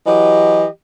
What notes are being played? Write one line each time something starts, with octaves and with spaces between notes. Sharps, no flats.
E3 F#3 G4 D#5